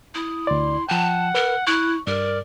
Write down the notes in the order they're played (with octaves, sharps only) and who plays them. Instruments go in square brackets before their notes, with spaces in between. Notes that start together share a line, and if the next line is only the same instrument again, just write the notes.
[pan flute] E4 [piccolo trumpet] D#6
[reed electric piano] D2 D5 [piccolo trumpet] C6
[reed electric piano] F3 G5 [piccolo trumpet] F#5 [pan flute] A5
[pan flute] A#4 [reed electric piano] B4
[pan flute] E4 [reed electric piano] C#6 [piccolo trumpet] F#6
[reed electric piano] G2 [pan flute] A#4 [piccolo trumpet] D5